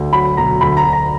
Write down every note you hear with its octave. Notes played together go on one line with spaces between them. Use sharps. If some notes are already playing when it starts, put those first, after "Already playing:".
Already playing: D2
F#3 B5
B1 A#5
D2 B5
A#5
D2
A#5